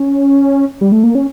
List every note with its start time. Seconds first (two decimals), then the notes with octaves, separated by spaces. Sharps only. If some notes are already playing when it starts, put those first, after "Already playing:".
Already playing: C#4
0.81 G3
0.92 A3
1.04 A#3
1.15 C#4